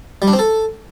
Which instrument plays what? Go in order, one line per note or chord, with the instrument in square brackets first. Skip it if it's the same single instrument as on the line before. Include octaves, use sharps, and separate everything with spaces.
[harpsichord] G3
D4
C4
A4